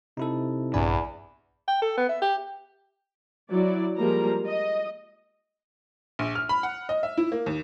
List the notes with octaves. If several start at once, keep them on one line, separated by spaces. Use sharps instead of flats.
C3 D#4 E4 A4
A#1 E2 G2 D4 D5 G#5 B5
G5
A4
B3
E5
G4
F#3 E4 D5
F3 G3 G#3 A#3 A#5
D#5
A#1
F6
B5
F#5
D#5
E5
E4
A#3
D#2